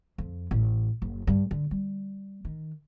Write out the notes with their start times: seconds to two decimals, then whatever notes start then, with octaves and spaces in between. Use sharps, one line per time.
0.18 F2
0.51 A1
1.02 F#1
1.27 G2
1.51 D3
1.71 G3
2.45 D#3